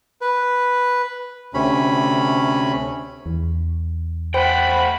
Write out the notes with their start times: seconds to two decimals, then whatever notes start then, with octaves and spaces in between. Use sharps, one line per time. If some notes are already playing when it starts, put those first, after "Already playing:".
0.21 B4
1.54 D2 C3 C#4 B5
3.26 E2
4.34 A3 C5 F#5 G5 B5